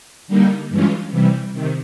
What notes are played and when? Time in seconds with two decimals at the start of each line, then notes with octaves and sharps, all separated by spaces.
0.28 D3 G3 A#3 D#4
0.70 G2 E3 G#3 C#4 F4
1.11 C3 E3 G3
1.53 C3 D#3